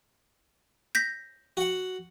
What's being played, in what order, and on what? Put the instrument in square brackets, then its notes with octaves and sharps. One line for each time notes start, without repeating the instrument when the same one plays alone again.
[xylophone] G6 A#6 B6
[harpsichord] F#4 F#5